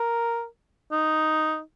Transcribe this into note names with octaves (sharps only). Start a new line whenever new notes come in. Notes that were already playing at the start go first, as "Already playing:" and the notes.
Already playing: A#4
D#4